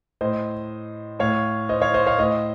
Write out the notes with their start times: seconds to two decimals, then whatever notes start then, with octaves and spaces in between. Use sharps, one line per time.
0.21 A2 C5 D#5
1.19 A2 C#5 F5
1.69 C5 D#5
1.82 C#5 F5
1.94 C5 D#5
2.07 C#5 F5
2.19 A2 C5 D#5